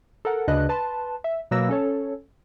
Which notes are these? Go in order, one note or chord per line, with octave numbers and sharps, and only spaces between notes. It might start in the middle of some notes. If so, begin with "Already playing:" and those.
A4 A#4 F#5
D2 C#3 D4 B4 D#5 F#6
B4 A5 C6
E5
B2 F#3 A#3 B4 E6 A#6
C#4 A4 C#5